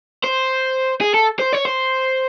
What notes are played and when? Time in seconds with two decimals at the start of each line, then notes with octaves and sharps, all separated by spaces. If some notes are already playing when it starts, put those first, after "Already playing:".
0.24 C5
1.01 G#4
1.15 A4
1.40 C5
1.53 C#5
1.65 C5